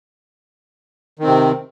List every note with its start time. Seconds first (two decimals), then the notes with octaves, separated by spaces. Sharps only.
1.19 D#3
1.23 C4
1.27 C3